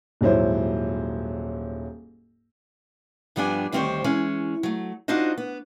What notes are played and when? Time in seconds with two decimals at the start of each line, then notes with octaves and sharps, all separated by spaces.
0.21 D#1 G#2 F#3 E4 C5
3.36 G2 F3 G3 B3 D4 G#5
3.72 D2 D#3 G3 C4 C5 C#5
4.04 E3 G#3 C#4
4.63 F#3 A3
5.08 D4 D#4 F4 F#4 C5 D#5
5.38 B3